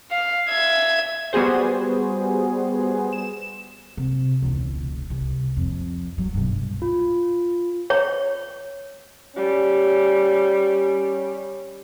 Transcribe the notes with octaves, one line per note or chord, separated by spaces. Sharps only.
F5
E5 G#6
G3 B3 F#4 G#4 C5
E7
C3
E1 C#2
C2
F2
F#3
G2 B2
F4
C#5
G3 C#4